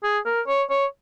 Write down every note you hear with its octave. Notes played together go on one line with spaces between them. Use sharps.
G#4
A#4
C#5
C#5